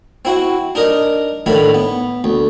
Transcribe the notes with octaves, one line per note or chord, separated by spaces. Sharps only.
C4 E4 F#4
D4 D#4 A#4 D#5
A2 D3 D#3 E4 B5
B3
D2